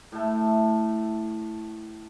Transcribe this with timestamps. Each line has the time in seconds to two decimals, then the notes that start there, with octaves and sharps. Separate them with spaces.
0.12 A2 A3